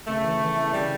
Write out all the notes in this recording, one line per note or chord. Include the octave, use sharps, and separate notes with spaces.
C#3 A3
E3
E3
C#3
C#3 G3